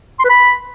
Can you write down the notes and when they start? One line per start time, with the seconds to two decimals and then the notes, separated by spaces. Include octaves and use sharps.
0.20 C6
0.25 B4
0.30 B5